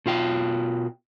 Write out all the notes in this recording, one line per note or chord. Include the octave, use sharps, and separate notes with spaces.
B2 F4 G5